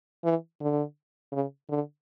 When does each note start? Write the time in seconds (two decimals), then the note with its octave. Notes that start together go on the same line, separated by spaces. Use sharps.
0.24 E3
0.61 D3
1.32 C#3
1.69 D3